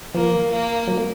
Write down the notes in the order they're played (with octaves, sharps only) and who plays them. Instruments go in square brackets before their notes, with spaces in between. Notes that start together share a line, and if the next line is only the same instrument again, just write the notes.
[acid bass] F3 [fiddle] A#3
[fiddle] A#3
[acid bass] F#3
A#3